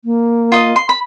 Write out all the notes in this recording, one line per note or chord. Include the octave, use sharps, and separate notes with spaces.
A#3
F4 D#5
C6
B5